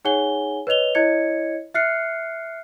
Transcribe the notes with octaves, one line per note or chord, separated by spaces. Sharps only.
D#4 G#4 C#5 F#5 G#5 G7
B4 C#5 D#5 F7 G7
E4 C#5 D#5 G#6 C#7
E5 F6 F#6 C7 C#7